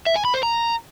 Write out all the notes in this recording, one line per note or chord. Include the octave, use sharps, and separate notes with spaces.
E5
G#5
B5
C5
A#5